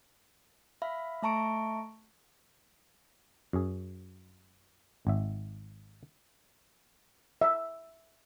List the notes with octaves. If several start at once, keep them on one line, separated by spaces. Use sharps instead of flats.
E5 F5 B5
A3 E5 A5 A#5 C#6 D7
F#2 G#4
G#1 E5
E5